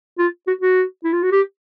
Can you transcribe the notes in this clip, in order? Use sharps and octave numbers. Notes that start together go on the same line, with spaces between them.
F4
F#4
F#4
E4
F4
F#4
G4